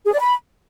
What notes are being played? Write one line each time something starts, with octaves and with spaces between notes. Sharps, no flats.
G#4
D5
B5